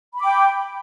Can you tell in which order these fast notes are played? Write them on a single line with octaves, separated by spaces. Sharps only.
B5 D6 G5